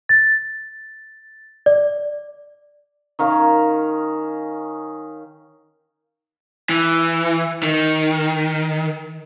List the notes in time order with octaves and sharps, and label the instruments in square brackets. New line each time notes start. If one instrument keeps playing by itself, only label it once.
[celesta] A6
D5
[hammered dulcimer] D#3 C#4 F5
[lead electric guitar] E3
D#3